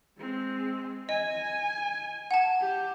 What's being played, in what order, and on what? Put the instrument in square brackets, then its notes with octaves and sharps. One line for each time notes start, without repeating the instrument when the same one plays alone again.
[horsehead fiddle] G#3 C4
[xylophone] D#5 [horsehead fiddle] G#5
[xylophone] F#5 A5
[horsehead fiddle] G4